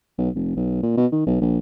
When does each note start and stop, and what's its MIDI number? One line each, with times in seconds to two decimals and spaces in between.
0.18 0.29 35
0.36 0.51 29
0.56 0.78 35
0.83 0.93 46
0.97 1.06 47
1.12 1.23 51
1.27 1.40 35
1.41 1.58 34